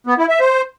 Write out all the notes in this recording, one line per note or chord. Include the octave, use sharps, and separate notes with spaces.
B3
E4
E5
C5